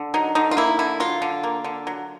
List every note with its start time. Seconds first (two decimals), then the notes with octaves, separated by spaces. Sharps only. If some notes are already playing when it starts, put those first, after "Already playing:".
Already playing: D3
0.14 F#3 D#4
0.35 D3 D#4
0.51 F4
0.57 A#3 E4
0.79 D3 E4
1.00 F#3 F4
1.22 D3
1.43 A#3
1.64 D3
1.87 F#3